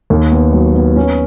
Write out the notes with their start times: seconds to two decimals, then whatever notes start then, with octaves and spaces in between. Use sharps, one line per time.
0.10 D#2
0.32 B3
0.53 F#3
0.74 B3
0.96 C#4